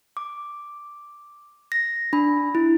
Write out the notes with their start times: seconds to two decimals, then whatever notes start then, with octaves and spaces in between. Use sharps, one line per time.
0.17 D6
1.72 A#6
2.13 D4 B5
2.55 E4